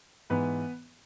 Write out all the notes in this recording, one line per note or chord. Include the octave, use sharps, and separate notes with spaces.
G#2 E3 B3 B4